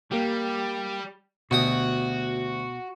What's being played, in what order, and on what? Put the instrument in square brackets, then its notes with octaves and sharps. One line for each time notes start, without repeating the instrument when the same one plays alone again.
[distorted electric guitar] G3 [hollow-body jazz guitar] A#3 G4
[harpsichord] D2 G4 D#6 [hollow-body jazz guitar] B2 [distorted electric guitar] F#4